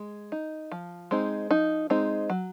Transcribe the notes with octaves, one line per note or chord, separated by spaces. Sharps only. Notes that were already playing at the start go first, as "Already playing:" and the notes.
Already playing: G#3
D#4
F3
G#3 C4 D#4
F3 D#4
G#3 C4 D#4
F#3